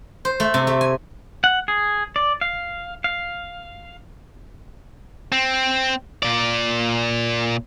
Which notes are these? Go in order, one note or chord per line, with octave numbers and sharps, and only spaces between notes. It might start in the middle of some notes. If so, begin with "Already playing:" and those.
C5
A3
C3
A3
G#5
F#5
G#4
D5
F5
F5
C4
A#2 D5